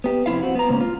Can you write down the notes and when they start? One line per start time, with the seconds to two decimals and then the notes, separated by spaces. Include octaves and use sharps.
0.04 B3 G4
0.26 F2 C3 E4 F5
0.43 C4 F#4
0.55 B3 A#5
0.69 G#2 C#3 A#3 C#4
0.81 F4